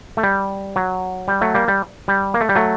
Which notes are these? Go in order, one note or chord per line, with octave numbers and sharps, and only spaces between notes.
A3
G3
F#3
G3
F#3 A3
G3 A#3
G3
G3
A#3
A3
G3
F#3 A3